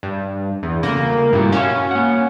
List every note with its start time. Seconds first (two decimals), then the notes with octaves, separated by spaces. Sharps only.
0.03 G2
0.63 E2
0.83 C#3 A3 A#3
1.33 G2 A#2 E4 F#4
1.52 C#4 F#4 E5 F5
1.91 A#3 F#5